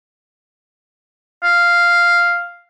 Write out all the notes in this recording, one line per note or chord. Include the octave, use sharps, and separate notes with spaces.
F5